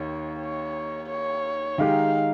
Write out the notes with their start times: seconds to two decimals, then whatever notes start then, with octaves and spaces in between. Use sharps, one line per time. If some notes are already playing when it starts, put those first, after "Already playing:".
Already playing: D#2 D#3 C#5
0.39 C#5
1.09 C#5
1.78 D#3 G#3 D#4 G4 F5